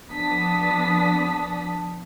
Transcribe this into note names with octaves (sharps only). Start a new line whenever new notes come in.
F3 B3 D4 A5 D#6 B6